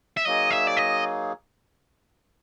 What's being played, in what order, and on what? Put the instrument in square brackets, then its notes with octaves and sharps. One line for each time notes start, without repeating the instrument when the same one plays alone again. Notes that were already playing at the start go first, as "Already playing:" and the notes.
[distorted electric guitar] E5
[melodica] F#3 A#3 D#4 G#4 [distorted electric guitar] D#5
[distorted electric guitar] E5
D5
D#5